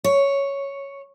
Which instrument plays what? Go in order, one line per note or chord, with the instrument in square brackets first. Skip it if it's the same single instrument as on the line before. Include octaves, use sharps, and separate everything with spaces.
[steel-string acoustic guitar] C#5